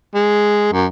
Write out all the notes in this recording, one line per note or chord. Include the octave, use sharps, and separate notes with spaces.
G#3
F#2